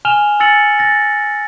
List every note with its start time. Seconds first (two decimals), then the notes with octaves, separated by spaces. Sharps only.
0.05 G#5 F6 E7 F7 G7
0.40 G#5 E6 A6 C#7 F#7
0.79 A6 A#6